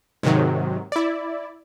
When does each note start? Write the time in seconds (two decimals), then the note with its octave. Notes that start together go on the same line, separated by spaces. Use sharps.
0.23 G#2 C3 D#3 F#3
0.92 E4 D5